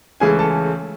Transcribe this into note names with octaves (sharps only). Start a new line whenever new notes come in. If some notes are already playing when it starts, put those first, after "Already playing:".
C#2 C#3 E3 A3 G#4 G#5
A4 A5